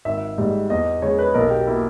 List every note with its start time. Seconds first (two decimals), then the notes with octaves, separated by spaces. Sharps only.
0.05 G#1 E5
0.38 G#2 G3
0.70 E2 D#5
1.02 C#3 G#3 C#5
1.19 B4
1.34 B1 A#4
1.50 G4
1.67 B2 A#3 E4